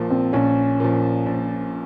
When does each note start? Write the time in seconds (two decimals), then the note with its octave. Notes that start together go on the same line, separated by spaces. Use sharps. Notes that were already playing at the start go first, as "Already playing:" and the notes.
Already playing: A#1 A#2 F3
0.11 C4
0.33 A#1 C#4
0.80 A#2 F3
1.26 A#1